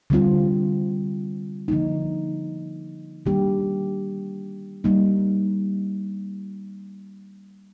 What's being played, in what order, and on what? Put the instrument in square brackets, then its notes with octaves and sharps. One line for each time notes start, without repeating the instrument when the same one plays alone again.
[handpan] D3 G3 C4 F4
D3 F3 A#3 D#4
D#3 G3 A#3 D4 G4
G3 A#3 D#4